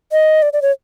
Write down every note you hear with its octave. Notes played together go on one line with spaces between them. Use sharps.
D#5
D5
D5
C#5